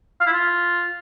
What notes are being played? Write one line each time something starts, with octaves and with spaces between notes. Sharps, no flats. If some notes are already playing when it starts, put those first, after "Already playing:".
F5
E4
F4